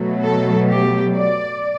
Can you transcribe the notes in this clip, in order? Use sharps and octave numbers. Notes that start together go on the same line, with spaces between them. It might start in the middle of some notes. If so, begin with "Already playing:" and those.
Already playing: B2 F#3 A3
A4
G4
D5